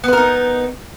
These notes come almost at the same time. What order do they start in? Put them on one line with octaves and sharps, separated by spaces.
B3 B4 A#4 D#4